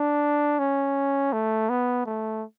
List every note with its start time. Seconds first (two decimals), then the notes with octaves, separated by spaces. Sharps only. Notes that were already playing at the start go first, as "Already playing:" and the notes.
Already playing: D4
0.59 C#4
1.33 A3
1.70 B3
2.06 A3